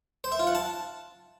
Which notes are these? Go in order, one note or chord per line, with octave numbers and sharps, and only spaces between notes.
C5
E5
F4
F#5
A5